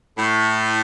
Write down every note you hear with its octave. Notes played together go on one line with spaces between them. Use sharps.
A2